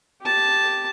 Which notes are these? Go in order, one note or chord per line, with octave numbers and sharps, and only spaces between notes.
G4 A5